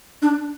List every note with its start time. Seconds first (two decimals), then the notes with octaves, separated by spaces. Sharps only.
0.22 D4